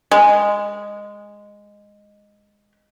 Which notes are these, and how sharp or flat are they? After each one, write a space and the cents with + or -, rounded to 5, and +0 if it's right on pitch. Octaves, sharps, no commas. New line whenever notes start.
G#3 -10